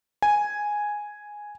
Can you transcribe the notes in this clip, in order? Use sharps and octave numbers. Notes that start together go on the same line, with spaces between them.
G#5